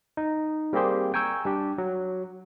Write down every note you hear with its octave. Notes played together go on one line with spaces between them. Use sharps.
D#4
G3 A#3 C4 G4 G#4 C5
G5 G#5 A#5 C#6 E6 G6
G3 D4 G4
F#3